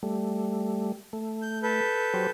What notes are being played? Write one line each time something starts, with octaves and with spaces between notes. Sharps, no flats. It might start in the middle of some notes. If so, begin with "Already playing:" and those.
G3 A3
A3
G6
A4 B4 G6
F#3 G4 C5